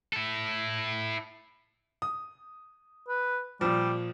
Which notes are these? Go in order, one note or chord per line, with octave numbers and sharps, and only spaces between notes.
E4 A4
D#6
B4
A#2 F3 G3